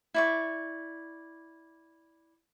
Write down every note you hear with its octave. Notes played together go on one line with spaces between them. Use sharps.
E4 D5 C#6